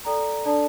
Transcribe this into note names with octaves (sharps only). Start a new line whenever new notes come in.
A4 D5 G5 A#5
D4 A4 D5 A5